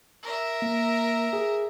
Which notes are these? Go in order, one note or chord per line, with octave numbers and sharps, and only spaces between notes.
A#4 E5
A#3
G#4